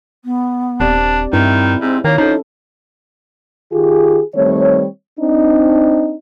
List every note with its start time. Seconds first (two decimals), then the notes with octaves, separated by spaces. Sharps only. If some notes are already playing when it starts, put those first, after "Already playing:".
0.24 B3
0.80 D#1 C4 D4 G4 D5
1.33 G2 D#3 C4 E4
1.81 G#2 C4
2.04 D#3 A#3 C#5
2.18 F3 C#4 D#4 A4
3.72 D#3 F4 G4 G#4
4.35 D#3 G3 A3 C4 C#5
5.19 C4 D4 D#4